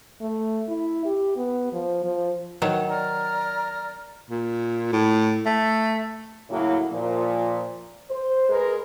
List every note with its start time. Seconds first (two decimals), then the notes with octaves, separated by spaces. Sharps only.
0.21 A3
0.69 E4
1.05 G4
1.37 B3
1.73 F3
2.04 F3
2.62 D#3 F#3
2.89 D5 A#5 F6
4.30 A#2
4.92 A2
5.46 A3
6.49 A2 C#3 F#3 A#3 E4
6.91 A#2 F3
8.11 C5
8.49 G#3 A#4 B4